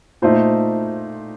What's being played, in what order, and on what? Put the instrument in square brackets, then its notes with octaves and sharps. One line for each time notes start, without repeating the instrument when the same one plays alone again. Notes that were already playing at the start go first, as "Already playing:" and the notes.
[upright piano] A#2 A3 D#4 C5